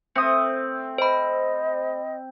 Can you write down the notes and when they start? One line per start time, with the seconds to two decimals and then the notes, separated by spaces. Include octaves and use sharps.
0.16 A3 C4 D#6
0.98 C5 D#5 B5